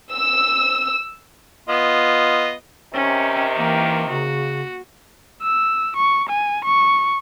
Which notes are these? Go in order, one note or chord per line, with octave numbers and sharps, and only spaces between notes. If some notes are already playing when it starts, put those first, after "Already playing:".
E6
B3 F4 D#5
C3 D#3 C#4
E3 A#3
C#3 F#4
E6
C#6
G#5
C#6